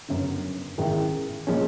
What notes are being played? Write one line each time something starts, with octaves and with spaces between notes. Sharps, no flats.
G1 F#2 C#3
A1 G#2 D#3 G#3
A#2 F3 G#3 C#4